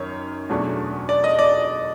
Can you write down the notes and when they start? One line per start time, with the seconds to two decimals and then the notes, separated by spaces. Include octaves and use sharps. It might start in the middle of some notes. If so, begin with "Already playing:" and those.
Already playing: F#2 D#3 C#5
0.49 E2 B2 F#3 A3 D4
1.09 D5
1.24 D#5
1.39 D5